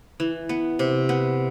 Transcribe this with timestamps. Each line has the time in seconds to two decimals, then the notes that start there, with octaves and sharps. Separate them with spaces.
0.20 E3
0.49 B3
0.79 C3
1.09 B3